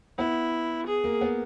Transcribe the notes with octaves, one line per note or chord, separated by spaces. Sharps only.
B3 E4
G#4
A#3
B3